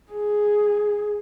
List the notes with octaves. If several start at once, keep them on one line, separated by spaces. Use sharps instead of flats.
G#4